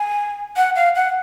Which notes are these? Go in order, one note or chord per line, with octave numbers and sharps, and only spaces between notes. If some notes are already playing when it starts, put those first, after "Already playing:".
Already playing: G#5
F#5
F5
F#5